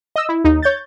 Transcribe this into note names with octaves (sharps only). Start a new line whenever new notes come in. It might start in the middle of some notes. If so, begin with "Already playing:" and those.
D#5 E6
E4
D#2 D#4
C#5 G6 A6